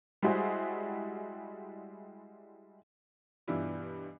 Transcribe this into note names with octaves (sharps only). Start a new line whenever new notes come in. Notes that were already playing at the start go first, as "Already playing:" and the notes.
G3 G#3 E4 F#4 G#4 C5
G2 B2 E3 D4 E4 F4